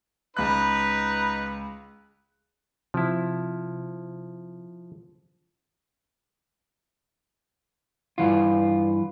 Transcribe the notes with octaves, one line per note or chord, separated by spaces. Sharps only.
C#2 D#4 B4 F#6
C3 F3 E4
G2 E3 F4